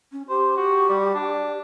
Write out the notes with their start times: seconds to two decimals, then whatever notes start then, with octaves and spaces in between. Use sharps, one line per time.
0.12 C#4
0.29 G4 C5
0.57 F#4
0.89 G3
1.14 D4